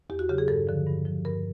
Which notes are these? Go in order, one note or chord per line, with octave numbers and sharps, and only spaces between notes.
E2 G4
F#4
C#3 F#3 G4
G#4
G2 A4
D3 F3
G2
D3 F3
G2 A#4